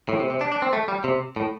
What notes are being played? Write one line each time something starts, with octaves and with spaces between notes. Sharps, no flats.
A2
C3
C3
D4
D4
C4
A3
G3
C3
A2